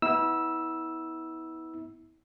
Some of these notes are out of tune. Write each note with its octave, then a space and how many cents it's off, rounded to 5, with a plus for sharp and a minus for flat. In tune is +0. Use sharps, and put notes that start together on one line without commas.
B3 +0 E4 -35 E6 +0